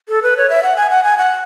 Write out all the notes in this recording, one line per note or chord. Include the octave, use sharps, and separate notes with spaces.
A4
B4
C#5
E5
F#5
G#5
F#5
G#5
F#5